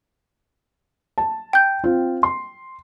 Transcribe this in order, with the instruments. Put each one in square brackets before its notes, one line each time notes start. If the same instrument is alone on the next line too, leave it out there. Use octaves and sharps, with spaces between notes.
[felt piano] A5
[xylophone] G5 G6
[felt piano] C4 F4
C6